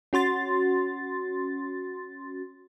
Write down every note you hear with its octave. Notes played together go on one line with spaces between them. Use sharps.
C#4 F#4 C6 A6